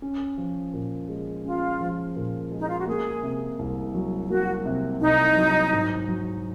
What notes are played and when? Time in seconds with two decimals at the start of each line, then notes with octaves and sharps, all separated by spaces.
0.02 C#4
0.38 F3
0.74 A#2
1.09 G#3
1.44 C#4 F4
1.81 F3
2.16 A#2
2.52 G#3
2.60 D#4
2.69 F4
2.79 F#4
2.88 A#3 G#4
3.23 C3
3.59 C2
3.95 F#3
4.26 F4
4.30 A#3 F#4
4.66 C3
5.01 C2 D#4
5.37 F#3
5.73 G#2
6.08 F#3